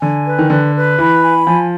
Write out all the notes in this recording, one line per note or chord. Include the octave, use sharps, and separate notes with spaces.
D3 G#5
B4
D#3
D3 B4
B4
E3 B5
G#5
F3 G#5